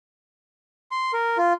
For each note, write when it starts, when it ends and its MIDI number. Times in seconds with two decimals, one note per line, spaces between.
0.91 1.12 84
1.13 1.38 70
1.38 1.53 65